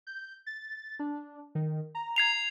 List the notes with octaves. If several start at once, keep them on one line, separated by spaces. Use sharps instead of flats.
G6
A6
D4
D#3
A#5
G#6 C7 F7